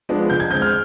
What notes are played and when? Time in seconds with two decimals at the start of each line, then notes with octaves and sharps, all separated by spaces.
0.09 F3 G#3 B3 D4
0.30 D3 G6
0.40 G#6
0.51 G#3 C4 G6
0.62 F6